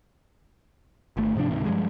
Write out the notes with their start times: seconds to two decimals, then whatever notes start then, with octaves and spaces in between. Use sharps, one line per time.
1.17 G1 A3
1.35 G#2 C3 F3 D4
1.51 D2 G#2 C3 D#3
1.65 G2 F3 G3 G#3